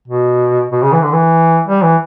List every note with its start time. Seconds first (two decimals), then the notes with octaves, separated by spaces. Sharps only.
0.08 B2
0.72 B2
0.83 C#3
0.93 E3
1.03 D3
1.12 E3
1.67 G3
1.83 E3